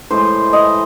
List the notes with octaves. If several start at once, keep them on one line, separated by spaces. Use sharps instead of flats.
A2 E3 G#3 C5
D#5